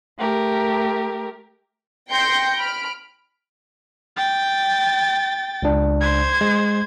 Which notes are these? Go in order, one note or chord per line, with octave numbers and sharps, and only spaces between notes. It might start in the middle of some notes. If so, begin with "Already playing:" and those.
A3 G4 A#4
G5 C6 G6 A#6 C#7 D7
B5 F6 D7
G5 A6
C#2 D4
C5 G#6
G#3